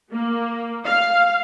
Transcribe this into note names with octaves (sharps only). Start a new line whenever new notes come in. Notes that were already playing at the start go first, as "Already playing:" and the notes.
A#3
F5